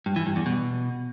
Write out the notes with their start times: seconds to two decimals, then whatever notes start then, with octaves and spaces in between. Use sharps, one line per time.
0.06 G2
0.16 E3
0.26 G2
0.36 E2
0.46 B2